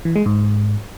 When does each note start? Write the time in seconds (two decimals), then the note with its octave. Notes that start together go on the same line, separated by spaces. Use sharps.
0.05 E3
0.16 G#3
0.26 G#2